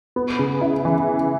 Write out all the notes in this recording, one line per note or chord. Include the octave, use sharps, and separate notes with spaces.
B3
C#3
E4
E3